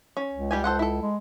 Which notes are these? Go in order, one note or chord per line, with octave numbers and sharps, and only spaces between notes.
C#4
C#2
G3 G4 G#5
A4 C5 F#5
E4 A4
G#3